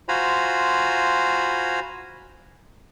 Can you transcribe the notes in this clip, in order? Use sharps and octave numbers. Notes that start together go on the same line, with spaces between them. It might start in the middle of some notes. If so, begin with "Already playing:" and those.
F4 F#4 C5 G#5 A#5 B5